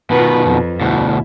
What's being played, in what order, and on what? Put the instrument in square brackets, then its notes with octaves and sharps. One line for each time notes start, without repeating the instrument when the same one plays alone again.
[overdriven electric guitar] B2 D#3 [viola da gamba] F4 B4
[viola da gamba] F2
[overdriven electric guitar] D2 B2 [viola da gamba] E4